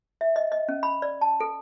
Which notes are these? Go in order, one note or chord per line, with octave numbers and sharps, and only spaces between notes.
E5
D#5
D#5
C#4
B5
D5
A5
A4